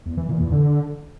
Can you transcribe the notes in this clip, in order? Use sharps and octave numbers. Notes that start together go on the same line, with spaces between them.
E2
E3
A#2
E2
D3